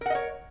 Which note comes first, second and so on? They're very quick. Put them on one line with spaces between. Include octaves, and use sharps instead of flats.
A#4 F#5 D#5 C#5